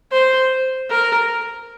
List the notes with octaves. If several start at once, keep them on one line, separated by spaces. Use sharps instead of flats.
C5
A#4